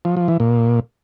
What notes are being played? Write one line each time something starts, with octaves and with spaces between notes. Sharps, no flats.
F3
F3
E3
A#2